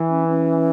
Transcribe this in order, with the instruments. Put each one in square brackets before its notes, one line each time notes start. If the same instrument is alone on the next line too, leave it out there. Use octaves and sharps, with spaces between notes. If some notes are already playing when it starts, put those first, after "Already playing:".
Already playing: [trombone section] E3
[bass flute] C#4
C#4